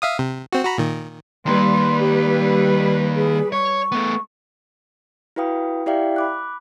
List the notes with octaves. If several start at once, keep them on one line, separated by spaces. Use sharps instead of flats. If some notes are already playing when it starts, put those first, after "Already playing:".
E5 F5 D#6
C3
C4 F#4
F#4 A#5 B5
A#2 D#3
D#3 G3 A#3 B4 C6
G4
G#4
C#5 C#6
A3 B3
E4 F#4 B4 F5 G5 D#6
E4 G4 D5 E5 F5 G5
B5 D6 F#6